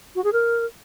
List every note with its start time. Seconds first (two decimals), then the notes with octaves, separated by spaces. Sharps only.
0.15 F#4
0.24 G#4
0.33 A#4